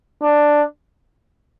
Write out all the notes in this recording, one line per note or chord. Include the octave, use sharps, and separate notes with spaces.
D4